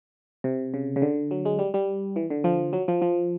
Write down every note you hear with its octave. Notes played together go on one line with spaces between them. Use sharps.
C3
C#3
C#3
D3
F#3
G#3
G3
G3
E3
D3
F3
F#3
F3
F3